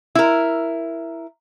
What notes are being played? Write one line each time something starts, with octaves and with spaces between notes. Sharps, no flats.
E4 A#4